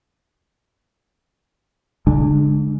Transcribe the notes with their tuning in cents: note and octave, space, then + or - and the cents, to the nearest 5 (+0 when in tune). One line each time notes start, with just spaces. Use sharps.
D3 -35 G#3 +0 D4 +30